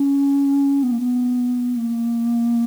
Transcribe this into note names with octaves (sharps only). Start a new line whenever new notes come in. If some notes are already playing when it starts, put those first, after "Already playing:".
Already playing: C#4
B3
A#3
B3
A#3